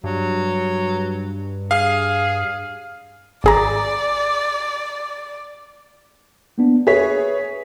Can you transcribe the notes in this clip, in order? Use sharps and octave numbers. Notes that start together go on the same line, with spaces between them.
G2 F#3
G#4 F5 F6
G#1 G#4 D5 A#5
A#3 B3 D4
G#4 B4 C#5 E5 B6